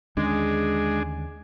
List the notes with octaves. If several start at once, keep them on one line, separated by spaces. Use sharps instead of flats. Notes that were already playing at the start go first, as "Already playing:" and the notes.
D#2 D3 G#3 C#4 D4 G#4